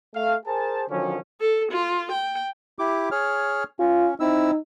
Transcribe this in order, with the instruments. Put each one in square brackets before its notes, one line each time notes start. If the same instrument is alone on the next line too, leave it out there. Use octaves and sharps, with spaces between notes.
[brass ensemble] A3 F5
G#4 A#4 C5 G#5 A5
D3 D#3 F3 F#3 C#4
[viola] A4
F4
G5
[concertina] E4 G4 D6
G#4 C#5 F6
[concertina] C#4 [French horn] F4
[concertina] C4 E4 E6 [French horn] D#4